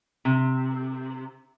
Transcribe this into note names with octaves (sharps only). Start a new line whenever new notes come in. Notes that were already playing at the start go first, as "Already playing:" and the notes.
C3